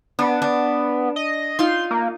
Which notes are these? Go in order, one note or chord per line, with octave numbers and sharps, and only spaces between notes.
B3 D4
D4
D#5
D#4 F4 C6
A#3